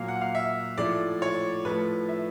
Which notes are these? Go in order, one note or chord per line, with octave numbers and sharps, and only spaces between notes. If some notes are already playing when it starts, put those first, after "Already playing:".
Already playing: A#2 F#3 A#3 F5
F#5
F5
E5
A2 F3 A3 D5
C#5
A2 F3 A3 B4
E5